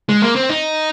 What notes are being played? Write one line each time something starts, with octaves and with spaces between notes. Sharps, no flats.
G#3
A#3
C4
D#4